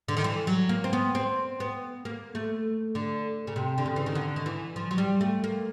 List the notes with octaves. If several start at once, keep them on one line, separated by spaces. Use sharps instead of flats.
D3
D#3
E3
F#3
A#3
C4
B3
C4
B3
A#3
A3
D3
C#3
C3
D3
C#3
E3
D#3
D3
D#3
E3
F3
F#3
G3
A3
A#3